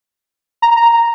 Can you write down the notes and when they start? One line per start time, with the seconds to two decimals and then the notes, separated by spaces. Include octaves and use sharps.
0.62 A#5
0.76 A#5